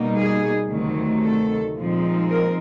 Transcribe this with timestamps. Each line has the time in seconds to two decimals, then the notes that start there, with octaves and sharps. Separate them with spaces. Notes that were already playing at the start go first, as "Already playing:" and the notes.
Already playing: B2 G3 A#3 D#4
0.16 G#4
0.70 D2 C3 D#3 F#3 A3
1.24 A4
1.78 A#2 F3 G#3 C4 D#4
2.30 A#4